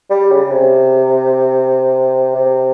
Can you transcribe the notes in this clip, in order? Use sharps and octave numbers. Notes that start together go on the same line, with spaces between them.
G3
C#3
C3
C3